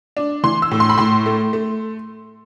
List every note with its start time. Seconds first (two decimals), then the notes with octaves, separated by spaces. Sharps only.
0.17 D4
0.44 E3 C6
0.62 E6
0.71 A2
0.80 C6
0.90 B5
0.98 A2 C6
1.26 A3
1.53 A3